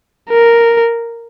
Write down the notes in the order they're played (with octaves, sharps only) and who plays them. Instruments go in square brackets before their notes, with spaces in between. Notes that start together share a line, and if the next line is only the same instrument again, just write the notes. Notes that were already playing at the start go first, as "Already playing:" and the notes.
[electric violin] A#4